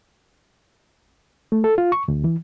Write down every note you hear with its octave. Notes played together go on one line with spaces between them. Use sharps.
A3
A4
F4
C#6
D2
E3